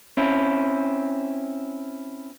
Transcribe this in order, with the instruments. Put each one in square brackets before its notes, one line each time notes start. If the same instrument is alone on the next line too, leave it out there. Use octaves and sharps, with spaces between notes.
[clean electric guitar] C4 C#4 E4